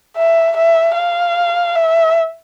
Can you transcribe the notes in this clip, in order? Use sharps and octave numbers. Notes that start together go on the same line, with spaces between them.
E5
E5
F5
E5